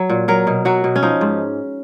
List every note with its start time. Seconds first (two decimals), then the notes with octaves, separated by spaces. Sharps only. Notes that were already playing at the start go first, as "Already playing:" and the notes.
Already playing: F#3
0.10 A#2
0.28 F#3 A#4
0.47 B2
0.65 F#3 F#4
0.84 B2
0.96 C#4
1.03 F3 D#4
1.21 G#2